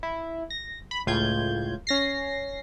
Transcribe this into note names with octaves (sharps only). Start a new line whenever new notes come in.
E4
A#6
B5
C#2 A2 F4 G6 G#6
C#4 A#6 C7